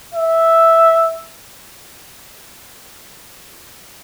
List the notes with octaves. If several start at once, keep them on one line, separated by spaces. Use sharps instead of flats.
E5